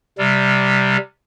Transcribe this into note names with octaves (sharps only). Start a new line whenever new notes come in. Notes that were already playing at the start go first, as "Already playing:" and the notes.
C3 G3